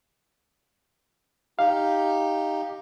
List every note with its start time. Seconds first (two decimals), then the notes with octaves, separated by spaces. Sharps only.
1.59 D#4 G4 F5